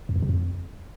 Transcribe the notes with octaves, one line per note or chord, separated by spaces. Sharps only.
F2
E2
C3
F2